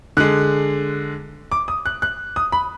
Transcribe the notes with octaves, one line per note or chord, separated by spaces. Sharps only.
D3 G#3 F#6
D6
D#6
F#6
F#6
D#6
B5